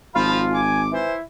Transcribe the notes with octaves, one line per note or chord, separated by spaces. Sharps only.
G#1 F3 F4 F5 B5
G#5 D6
E3 E4 C5